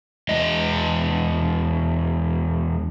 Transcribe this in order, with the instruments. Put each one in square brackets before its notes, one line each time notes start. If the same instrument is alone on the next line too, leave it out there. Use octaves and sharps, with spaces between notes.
[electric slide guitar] E2 G#3 D#5